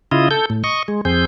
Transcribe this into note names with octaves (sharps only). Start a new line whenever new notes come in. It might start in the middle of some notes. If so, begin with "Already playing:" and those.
C#3 E4 F4 D#5
A4 G6
A2
D#5 C#6
G#3
F2 C4 G#4 G6